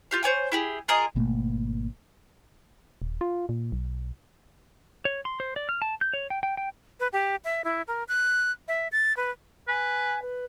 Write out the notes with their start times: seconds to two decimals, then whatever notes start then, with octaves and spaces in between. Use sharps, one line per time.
0.11 F4 G4 F5
0.23 C5 C#5 G5 G#5
0.52 E4 G4 G#4
0.88 F4 G#4 A#4 D#5
1.15 G#1 B2 A3 A#3
3.02 D#1
3.21 F4
3.49 A#2
3.72 B1
5.05 C#5
5.25 C6
5.40 C5
5.56 D5
5.69 F6
5.82 A5
6.01 G6
6.14 C#5
6.30 G5
6.43 G5
6.57 G5
7.00 B4
7.13 G4
7.45 E5
7.64 E4
7.88 A#4
8.08 F#6
8.68 E5
8.92 A6
9.17 B4
9.68 B4 G#5
10.21 B4